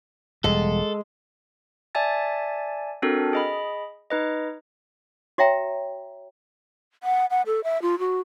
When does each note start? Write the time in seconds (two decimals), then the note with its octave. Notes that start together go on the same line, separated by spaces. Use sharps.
0.44 E1 G3 G#3 A4
1.95 D5 E5 G#5 A5 A6
3.02 C4 D4 F#4 A4 A#4
3.33 G#4 D#5 B5
4.10 D#4 B4 D#5
5.38 F#4 C#5 E5 G5 A#5
7.03 F#5
7.30 F#5
7.46 A4
7.64 E5
7.82 F4
7.99 F#4